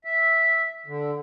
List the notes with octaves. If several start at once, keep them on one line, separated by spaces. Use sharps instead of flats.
E5
D3